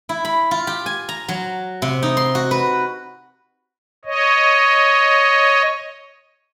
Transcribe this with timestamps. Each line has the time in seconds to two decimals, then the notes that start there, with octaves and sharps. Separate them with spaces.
0.09 E4
0.25 B5
0.51 F4
0.67 G4
0.86 G#5
1.09 A#5
1.28 F#3
1.82 C3
2.03 D#4
2.17 C6
2.35 F#4
2.51 B4
4.05 C#5 D#5